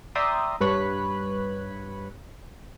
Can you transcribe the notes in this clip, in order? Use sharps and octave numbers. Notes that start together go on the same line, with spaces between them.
D5 E5 G5 A#5 C6 D#6
G2 B4 C#5 F#6 B6